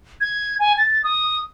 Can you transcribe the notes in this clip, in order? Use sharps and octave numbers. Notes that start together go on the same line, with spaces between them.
G#6
G#5
A6
D#6